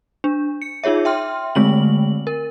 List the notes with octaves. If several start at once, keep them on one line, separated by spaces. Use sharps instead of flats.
D4
C#7
D#4 F4 G#4 C#5 E5
E5 G5 C6 F6
D3 G#3 A3 C4 F#7
A#4